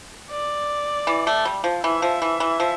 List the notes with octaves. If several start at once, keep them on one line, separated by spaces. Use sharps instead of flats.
D5
E3
A3
G3
F3
E3 E5
F3
E3
E3
F3